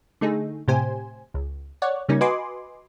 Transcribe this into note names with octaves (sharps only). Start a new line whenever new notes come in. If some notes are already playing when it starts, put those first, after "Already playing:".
D3 A3 D#4 G#4
A2 C3 G4 C5 G#5
C#2
C#5 D5 F#5
C#3 G3 A#3 C#4 D#4
F#4 B4 D#5 G#5 C6 D6